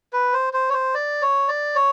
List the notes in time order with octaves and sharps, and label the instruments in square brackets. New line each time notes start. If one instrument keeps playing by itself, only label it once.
[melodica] B4
C5
C5
C#5
C5
D5
C#5
D5
C#5